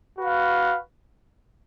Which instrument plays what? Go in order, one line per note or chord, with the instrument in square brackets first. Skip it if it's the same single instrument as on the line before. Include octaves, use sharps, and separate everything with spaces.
[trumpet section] F#4 B4 F5